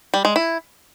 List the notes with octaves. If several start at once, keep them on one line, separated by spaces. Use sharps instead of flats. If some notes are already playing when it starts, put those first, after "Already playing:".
G3
G#3
E4